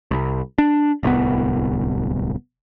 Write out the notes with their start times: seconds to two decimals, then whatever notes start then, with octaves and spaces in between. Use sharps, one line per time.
0.11 C2
0.58 D4
1.03 D1 C2 B3